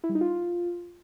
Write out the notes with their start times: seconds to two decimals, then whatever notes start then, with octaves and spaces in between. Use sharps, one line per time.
0.04 E4
0.09 G3
0.15 D#4
0.21 F4